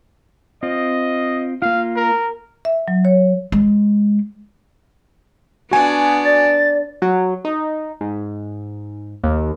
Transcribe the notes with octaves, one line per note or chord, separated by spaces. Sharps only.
C4 F4 D#5
A#3 F4 F5
A#4
E5
F#3
C#5
G#3
B3 D4 F#4 G#5
D5 A6
F#3
D#4
G#2
D#2